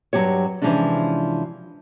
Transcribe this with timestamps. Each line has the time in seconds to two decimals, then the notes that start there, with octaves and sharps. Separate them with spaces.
0.13 G2 F#3 C4 G4 C#5
0.62 C3 E3 F3 G#3 C#4 D4